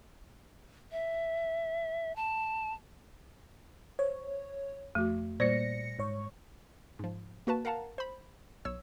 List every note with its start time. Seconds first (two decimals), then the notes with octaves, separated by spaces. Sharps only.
0.92 E5
2.16 A5
3.99 C5 C#5
4.95 F2 A3 F#4
5.40 A#2 G3 C5 D5 A#6 C#7
5.99 G#2 C#5 C#6
6.99 G#2 F3
7.47 A#3 F#4 B4 A5
7.65 A#4 F5 F#5 A5 A#5
7.98 C5 B5
8.65 B1 C#5 E6